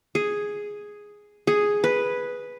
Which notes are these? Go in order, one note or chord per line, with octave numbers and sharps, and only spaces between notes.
G#4
G#4
B4